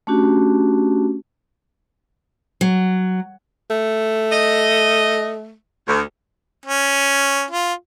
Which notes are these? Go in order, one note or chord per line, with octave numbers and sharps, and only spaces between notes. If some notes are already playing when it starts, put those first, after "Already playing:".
A3 C#4 D4 F#4 G4
F#3
A3
D#5
D2
C#4
F4